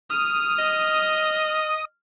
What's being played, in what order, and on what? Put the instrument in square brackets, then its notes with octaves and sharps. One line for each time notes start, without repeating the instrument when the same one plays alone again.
[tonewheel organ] D#6 [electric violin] F6
[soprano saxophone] D#5